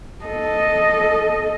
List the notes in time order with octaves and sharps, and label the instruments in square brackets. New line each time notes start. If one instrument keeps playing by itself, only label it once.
[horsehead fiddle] A4 D#5